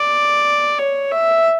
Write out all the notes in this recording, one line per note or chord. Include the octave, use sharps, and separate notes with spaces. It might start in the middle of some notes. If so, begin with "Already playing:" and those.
Already playing: D5
C#5
E5